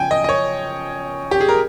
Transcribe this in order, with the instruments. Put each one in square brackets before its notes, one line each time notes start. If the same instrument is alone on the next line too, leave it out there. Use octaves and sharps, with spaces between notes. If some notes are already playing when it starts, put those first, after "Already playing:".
Already playing: [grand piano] C#3 F3 G5 G#5
D#5
D#5
C#5
G4
G#4
A#4